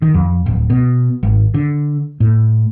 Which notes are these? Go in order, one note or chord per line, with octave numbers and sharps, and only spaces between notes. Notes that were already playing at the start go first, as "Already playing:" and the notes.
D#3
F2
D1
B2
G#1
D3
A2